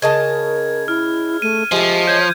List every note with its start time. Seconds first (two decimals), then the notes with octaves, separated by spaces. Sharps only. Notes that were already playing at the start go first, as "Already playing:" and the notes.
0.02 C#3 A#4 D#5 A5 G#6
0.88 E4 F6
1.42 A3 D#7
1.72 F3 G#3 A3 G4
2.07 C#5 G6 G#6